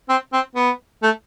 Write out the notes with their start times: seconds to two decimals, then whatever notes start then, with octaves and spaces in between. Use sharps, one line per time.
0.09 C4
0.33 C4
0.56 B3
1.03 A3